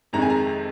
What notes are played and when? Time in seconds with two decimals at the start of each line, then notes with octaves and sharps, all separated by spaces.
0.13 F2 C3 D#3 G#3 A#5
0.22 G#5
0.30 A#5